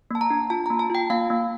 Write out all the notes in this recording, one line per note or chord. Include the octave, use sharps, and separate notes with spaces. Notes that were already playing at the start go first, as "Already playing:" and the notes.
A#3 A5
A#5
D4
F4 A5
A#5
A#3
A5
F4 G5
A#3 F5
A#3